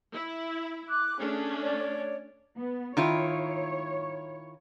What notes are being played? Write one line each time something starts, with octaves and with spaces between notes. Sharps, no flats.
E4
D6 F#6
A3 C#4 D4 G#4
C#5 D5
B3
D#3 E4 F4 C#5